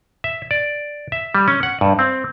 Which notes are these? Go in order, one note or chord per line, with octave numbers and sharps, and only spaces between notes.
E5
D5
E5
G3
C#4
F#5
G2
C4